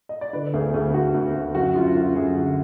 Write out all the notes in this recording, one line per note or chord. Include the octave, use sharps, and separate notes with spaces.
D#5
D5
D3 B4
D2 G#4
D2 G#4
D2 F#4
D2
D2
F#2 F#4
F#2 F4
F#2 F4
F#2 G#4
D3